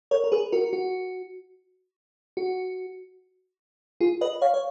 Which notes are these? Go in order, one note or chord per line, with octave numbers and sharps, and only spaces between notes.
A#4 C#5
A#4
G#4 B4
F#4 A#4
F#4
F#4
F4 G#4
B4 D#5
C#5 F5
C#5